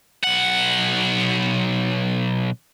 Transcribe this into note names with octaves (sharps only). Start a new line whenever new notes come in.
B1 F#5